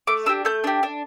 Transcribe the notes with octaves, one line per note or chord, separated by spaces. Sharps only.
A3 D6
D4 G4 E6
A3 G6
D4 G4
D4